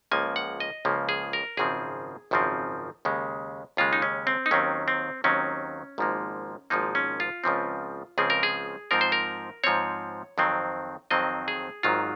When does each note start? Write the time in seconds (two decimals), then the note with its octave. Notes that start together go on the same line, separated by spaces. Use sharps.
0.11 C#2 C#3 F3 A#3 G#5
0.36 F#5
0.60 D#5
0.85 C#2 C#3 F3 A#3
1.09 G#4
1.33 A#4
1.57 G#1 F#2 C#3 F3 C4 G#4
2.31 G#1 F#2 C#3 F3 C4
3.05 D#2 C#3 G#3
3.77 D#2 C#3 G#3 F4
3.93 D#4
4.02 C#4
4.27 C4
4.46 D#4
4.51 D#2 D#3 F#3 C4 C#4
4.88 C4
5.24 D#2 D#3 F#3 C4 C#4
5.98 G#1 G#2 F3 A#3
6.70 G#1 G#2 F3 A#3 D#4
6.95 C#4
7.20 F4
7.44 C#2 C#3 F3 C4
8.18 C#2 C#3 F3 C4 G#4
8.30 A#4
8.43 G#4
8.91 G#2 F3 C4 A#4
9.01 C5
9.12 A#4
9.64 G#2 F3 C4 C#5
10.38 F2 D#3 F#3 C4
11.11 F2 D#3 F#3 C4 D#5
11.48 G#4
11.83 G#1 G#2 D#3 F#3 F4